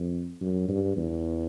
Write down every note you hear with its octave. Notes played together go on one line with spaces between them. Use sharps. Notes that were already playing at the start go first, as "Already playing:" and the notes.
Already playing: F2
F#2
G2
E2